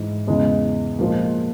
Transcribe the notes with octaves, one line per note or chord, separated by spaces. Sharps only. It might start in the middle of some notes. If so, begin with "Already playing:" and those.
Already playing: G#2 E3 G#3
E2 C#3 E3 G#3
A#2 F3 G#3